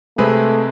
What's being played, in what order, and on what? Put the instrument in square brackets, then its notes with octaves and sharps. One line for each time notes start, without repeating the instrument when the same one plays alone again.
[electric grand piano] C3 G#3 C4 G#4 B4 [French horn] A3